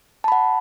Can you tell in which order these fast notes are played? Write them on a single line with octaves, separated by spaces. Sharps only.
A5 B5 F#5